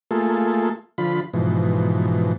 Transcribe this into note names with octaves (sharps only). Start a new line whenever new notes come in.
A3 A#3 F4 G#4 A4
D3 F3 F4 B5
G#2 B2 E3 F3